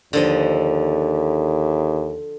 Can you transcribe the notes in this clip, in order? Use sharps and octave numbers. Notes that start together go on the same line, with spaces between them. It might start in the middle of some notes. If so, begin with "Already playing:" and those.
D#2 D3 F3 D#5